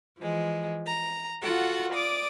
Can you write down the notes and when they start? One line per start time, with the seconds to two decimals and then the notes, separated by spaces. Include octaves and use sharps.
0.18 E3 F3 G#3
0.87 A#5
1.42 F4 F#4 A4 F#5
1.94 D5 D6 D#6